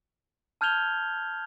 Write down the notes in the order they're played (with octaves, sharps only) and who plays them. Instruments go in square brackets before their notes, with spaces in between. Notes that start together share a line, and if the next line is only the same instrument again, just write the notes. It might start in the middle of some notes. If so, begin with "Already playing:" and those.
[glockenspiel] A5 F6 G6 G#6 F7 G7